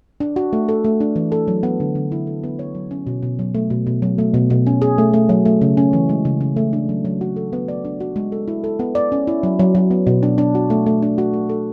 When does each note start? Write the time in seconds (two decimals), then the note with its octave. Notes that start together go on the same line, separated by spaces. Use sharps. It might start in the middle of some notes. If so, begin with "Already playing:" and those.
0.20 D4
0.36 F#4
0.53 A3
0.69 A4
0.84 A3
1.00 D4
1.16 E3
1.32 A4
1.48 F#3
1.63 B3
1.80 D3
1.95 D3
2.12 E4
2.27 A4
2.44 B3
2.59 C#5
2.75 F#3
2.91 C#4
3.07 B2
3.23 B2
3.39 F#3
3.55 A3
3.70 B2
3.87 B2
4.02 F#3
4.18 A3
4.34 B2
4.50 B2
4.67 C#4
4.82 G#4
4.98 A3
5.13 A3
5.29 F#3
5.45 A3
5.61 C#3
5.77 C#4
5.93 E3
6.09 G#3
6.25 C#3
6.41 C#3
6.57 A3
6.73 D4
6.89 F#3
7.05 F#3
7.21 F#4
7.36 A4
7.53 B3
7.68 D5
7.85 D4
8.00 F#4
8.16 G#3
8.32 A4
8.48 E4
8.64 A4
8.79 B3
8.95 D5
9.12 C#4
9.27 E4
9.43 F#3
9.59 F#3
9.75 F#3
9.91 B3
10.07 B2
10.23 D4
10.38 D4
10.55 F#4
10.70 A3
10.86 A3
11.02 D4
11.18 F#4
11.34 A3
11.49 A4